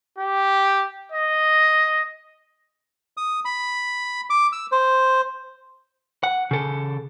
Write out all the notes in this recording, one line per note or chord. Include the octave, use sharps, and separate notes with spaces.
G4
D#5
D#6
B5
D6
E6
C5
F#5
C#3 A4